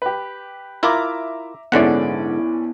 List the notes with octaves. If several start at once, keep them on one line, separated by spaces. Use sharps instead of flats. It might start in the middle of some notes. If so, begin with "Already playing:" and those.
G4 B4
E4 F4 A#4 E5 A#5 D6
A#1 G#2 D3 B3 C#4 E4 D5 F#5